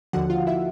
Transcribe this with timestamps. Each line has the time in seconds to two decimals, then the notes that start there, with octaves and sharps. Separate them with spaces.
0.13 D#2 D3 F3 F#4 F#5
0.30 F4 F5
0.47 E4 E5